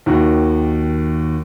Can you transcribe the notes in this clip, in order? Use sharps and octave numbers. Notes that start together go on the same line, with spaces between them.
D#2 D#3 F#4